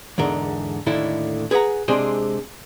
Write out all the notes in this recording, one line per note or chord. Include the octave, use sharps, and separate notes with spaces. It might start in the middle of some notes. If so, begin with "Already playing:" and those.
E2 G#2 D3 A#4
D#2 A2 D3 D#3 E4 A4
G#4 B4 D5 F#5 A#5
C3 G#3 C4 D4 G#4 C5